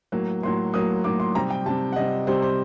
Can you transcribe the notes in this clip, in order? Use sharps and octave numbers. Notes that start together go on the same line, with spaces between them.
A2 F#3 A#3
A2 F#3 A#3 C6
A2 F#3 A#3 D#6
A2 F#3 A#3 D6
C6
C3 G3 C4 A#5
G5
C3 G3 C4 A5
F#5
C3 G3 C4 D#5
C3 G3 C4 C5
C5